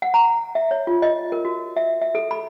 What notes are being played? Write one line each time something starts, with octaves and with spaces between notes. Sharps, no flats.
F#5
A#5
E5
C#5
F4
D#5
A#4
F#4
E5
E5
A4
B5